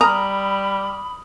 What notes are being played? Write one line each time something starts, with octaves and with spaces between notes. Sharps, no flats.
G3 A#5 B5 D#6 F6